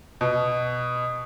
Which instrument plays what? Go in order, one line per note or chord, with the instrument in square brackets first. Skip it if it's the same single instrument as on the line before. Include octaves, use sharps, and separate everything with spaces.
[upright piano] B2